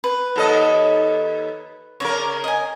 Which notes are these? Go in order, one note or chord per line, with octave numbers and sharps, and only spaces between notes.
B4
D#2 A4 D#5
C#3 A#4 C#5 D5
D#5 G#5